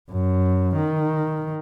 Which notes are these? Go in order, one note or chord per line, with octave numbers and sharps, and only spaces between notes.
F#2
D#3